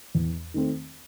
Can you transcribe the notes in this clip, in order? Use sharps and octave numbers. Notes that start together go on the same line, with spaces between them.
E2
D#3 A3 C4